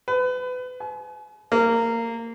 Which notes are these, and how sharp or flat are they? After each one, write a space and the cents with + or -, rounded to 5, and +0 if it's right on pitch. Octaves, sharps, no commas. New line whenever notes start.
B4 +30
G#5 +40
A#3 -20